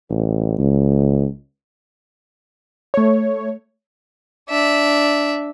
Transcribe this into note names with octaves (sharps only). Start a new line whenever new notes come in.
A1
C#2
A3 C#5
D4 E5